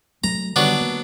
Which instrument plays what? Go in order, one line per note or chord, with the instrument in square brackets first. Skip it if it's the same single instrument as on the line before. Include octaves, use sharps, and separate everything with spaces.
[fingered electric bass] F#3 A3 [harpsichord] A#5
[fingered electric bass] D3 D#3 G3 [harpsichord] F#3 B3 D4
[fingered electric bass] A#3